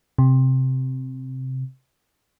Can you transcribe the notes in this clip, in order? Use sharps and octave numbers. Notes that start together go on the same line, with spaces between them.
C3